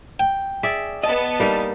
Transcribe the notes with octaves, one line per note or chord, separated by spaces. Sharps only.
G5
G#4 D5 E5
B3 D#5 A5
G3 A#3 D#4